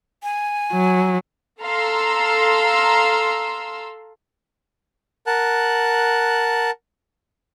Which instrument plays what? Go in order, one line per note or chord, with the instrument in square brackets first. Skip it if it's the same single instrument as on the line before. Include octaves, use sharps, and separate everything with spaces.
[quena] G#5
[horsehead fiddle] F#3
[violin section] A4 F5 A#5 C6 E6
[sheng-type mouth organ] A#4 F#5 A5 F#6